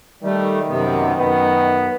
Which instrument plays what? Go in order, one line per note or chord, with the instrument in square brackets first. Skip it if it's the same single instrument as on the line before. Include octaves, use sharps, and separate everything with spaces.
[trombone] D#3 [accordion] G3 A3
[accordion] F#2 C3 B3
[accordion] F#2 [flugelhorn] B3